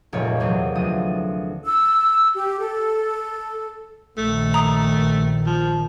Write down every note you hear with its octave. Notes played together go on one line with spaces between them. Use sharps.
F1 C#2 A#2 C#5
E2 C3 F#3 C4
D2 F3 D#6
E6
G4
A4
A#1 D#3 A3
A#5 D#6
F3